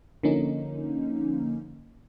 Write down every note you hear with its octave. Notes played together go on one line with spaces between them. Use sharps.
D3 F3 A#3 C#4 D#4